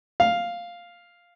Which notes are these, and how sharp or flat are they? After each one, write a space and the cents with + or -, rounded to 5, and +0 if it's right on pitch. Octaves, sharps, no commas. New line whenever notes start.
F5 +0